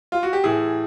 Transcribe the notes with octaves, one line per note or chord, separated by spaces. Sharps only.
F4
F#4
G4
A2 E3 G#4